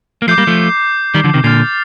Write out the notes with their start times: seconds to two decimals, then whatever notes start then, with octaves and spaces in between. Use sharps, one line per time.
0.22 A#3
0.28 F3 A3 D6 G6 C7
0.38 G3 A#3
0.47 F3 A3
1.14 D#3 G3
1.24 D3 F3
1.34 C3 D#3
1.44 A#2 D3 F6 A6 C7 F7